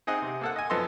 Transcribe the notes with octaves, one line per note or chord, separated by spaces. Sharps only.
C4 D#4 G#4 D#5 F#5
C3
A#3 A4 F#5
D#5 G#5
F#2 F3 B3 A4 D#5 C6